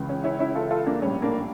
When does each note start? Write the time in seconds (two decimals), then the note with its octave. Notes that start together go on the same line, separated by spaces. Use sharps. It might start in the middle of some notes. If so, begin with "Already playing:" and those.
Already playing: C#2 C#3 E3
0.09 C#4
0.24 C#4 E4
0.39 C#4 E4
0.55 F4 A4
0.71 F4 A4
0.86 A#3 D4
1.02 A#1 A2 G3 C#4
1.22 A#3 D4